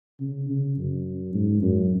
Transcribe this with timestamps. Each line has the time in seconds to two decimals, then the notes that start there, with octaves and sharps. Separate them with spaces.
0.20 C#3
0.49 C#3
0.77 F#2
1.34 G#2
1.61 F#2